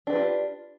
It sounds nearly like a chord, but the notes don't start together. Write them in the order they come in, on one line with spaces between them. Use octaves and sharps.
D4 B4 G4 F4